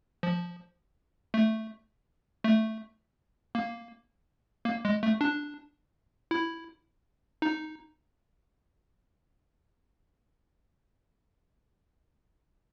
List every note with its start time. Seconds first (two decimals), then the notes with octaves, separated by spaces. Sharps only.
0.23 F3
1.34 A3
2.44 A3
3.55 A#3
4.65 A#3
4.85 G#3
5.03 A3
5.21 D4
6.31 E4
7.42 D#4